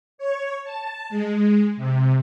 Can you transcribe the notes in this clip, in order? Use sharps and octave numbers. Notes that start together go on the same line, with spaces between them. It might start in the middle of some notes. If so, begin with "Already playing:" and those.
C#5
A5
G#3
C3